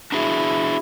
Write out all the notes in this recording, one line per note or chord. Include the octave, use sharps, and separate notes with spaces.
D4 E4 F#4 G#4